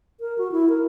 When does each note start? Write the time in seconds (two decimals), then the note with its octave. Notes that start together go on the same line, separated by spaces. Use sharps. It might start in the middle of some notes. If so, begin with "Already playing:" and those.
0.20 A#4
0.38 F#4
0.52 E4
0.69 A#4